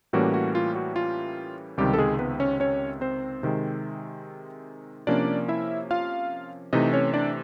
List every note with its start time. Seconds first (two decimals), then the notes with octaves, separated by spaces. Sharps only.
0.13 A2 E3 G3 A#3 C#4 F#4
0.34 F#4
0.55 F4
0.76 F#4
0.96 F4
1.77 C#2 C3 D#3 G3 G4
1.93 A4
1.98 G#3 G#4
2.19 B3 B4
2.40 C#4 C#5
2.60 C#4 C#5
3.01 C4 C5
3.43 C3 D#3 G#3
5.07 C3 F3 A#3 C#4 D4 D5
5.48 E4 E5
5.91 F4 F5
6.73 C3 E3 A3 D#4 D#5
6.92 C#4 C#5
7.14 D4 D5